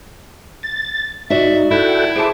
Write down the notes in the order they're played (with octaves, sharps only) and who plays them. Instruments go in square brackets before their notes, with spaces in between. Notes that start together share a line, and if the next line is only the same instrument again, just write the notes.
[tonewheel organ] A6
[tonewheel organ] G#2 D#4 [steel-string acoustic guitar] F#4 D5 [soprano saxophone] E5
[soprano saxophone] E4 [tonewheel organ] A4 F#5 G5
[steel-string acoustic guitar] G#4 A5 [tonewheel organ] C5 D6